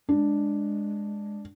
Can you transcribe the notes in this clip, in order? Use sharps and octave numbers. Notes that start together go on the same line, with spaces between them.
G#3 D4